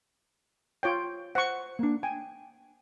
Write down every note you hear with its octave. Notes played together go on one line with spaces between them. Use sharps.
F4 C#5 G5
C5 F#5 C#6
A#3 D4
G5 G#5